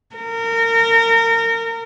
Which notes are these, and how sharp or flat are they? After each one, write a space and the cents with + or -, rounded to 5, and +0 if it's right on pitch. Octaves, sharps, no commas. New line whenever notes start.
A#4 -25